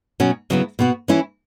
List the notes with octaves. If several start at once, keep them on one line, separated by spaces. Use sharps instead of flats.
B2 F#3 C#4 F#4
C#3 F#3 B3 E4
B2 B3 F#4
E3 C#4 E4